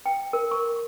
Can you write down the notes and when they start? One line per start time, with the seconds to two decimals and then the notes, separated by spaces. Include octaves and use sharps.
0.06 G5
0.33 A#4
0.51 C#6